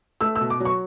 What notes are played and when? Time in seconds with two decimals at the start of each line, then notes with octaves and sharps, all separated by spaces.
0.21 A3 E6
0.36 E6
0.41 B2
0.50 D6
0.60 F#3
0.65 C#6